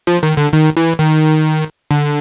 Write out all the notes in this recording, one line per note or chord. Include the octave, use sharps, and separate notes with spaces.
F3
D#3
D3
D#3
E3
D#3
D3